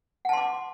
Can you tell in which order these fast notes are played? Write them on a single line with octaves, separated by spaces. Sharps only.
F#5 A5 C6 D6